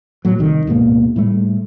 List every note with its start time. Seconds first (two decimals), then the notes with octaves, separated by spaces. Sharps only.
0.25 A2 F#3
0.39 C2 D#3
0.67 D1 G#2 B2 A#3
1.16 A2 G3 A3